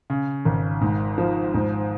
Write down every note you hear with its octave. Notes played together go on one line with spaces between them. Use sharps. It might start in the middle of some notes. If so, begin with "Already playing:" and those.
C#3
G#1
G#2
F3
G#2